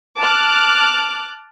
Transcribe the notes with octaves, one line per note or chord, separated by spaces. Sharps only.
A5 D6 F6 F#6